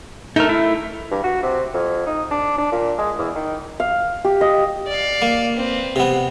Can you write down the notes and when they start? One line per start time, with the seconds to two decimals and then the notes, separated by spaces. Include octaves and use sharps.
0.36 A3 D#4 A#4
0.49 E4
1.11 G2
1.24 F#4
1.43 C3
1.74 F2
2.06 D#4
2.31 D4
2.58 D4
2.72 A#2
2.98 G#3
3.18 E2
3.35 D#3
3.80 F5
4.24 G4
4.41 D#5
4.87 D5 F5
5.22 A#3
5.56 C4 B4
5.96 C3 B3